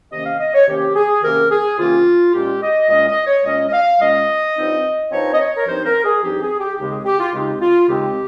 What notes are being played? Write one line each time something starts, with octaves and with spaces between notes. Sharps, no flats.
C3 D#3 A#3 C#4 D#5
F5
D#5
C#5
C3 D#3 A#3 C#4 G4
G#4
C3 D#3 A#3 C#4 A#4
G#4
C3 D#3 A#3 C#4 F4
A#2 G#3 C#4 G4
D#5
A#2 G#3 C#4 D#5
D#5
C#5
A#2 G#3 C#4 D#5
D#5
F5
A#2 G#3 C#4 D#5
G2 F3 C4 D#4
G2 F3 C4 D#4 C#5
D#5
C#5
A#4
G2 F3 C4 D#4 C5
A#4
G#4
G2 F3 C4 D#4 G4
G#4
G4
D#2 C#3 G#3 C4 D#4 G4
G#4
G4
F4
D#2 C#3 G#3 C4 D#4 G4
F4
D#2 C#3 G#3 C4 D#4 G4